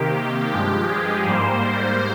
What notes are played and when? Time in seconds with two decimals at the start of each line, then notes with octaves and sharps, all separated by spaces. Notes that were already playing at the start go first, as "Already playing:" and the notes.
Already playing: C3 D#3 A#3 G4
0.51 G2 F3 G#3 G4
0.89 G#4
1.26 G#2 G3 A#3 C5